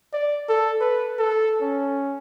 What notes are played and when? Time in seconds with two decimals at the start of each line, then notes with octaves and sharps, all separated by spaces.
0.13 D5
0.49 A4
0.81 B4
1.19 A4
1.61 C#4